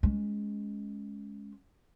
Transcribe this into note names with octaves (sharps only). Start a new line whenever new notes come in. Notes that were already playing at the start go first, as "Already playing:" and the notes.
G#3 C#4